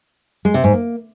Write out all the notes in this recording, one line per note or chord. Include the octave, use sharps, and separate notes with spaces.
G#3
C3
G#2
A#3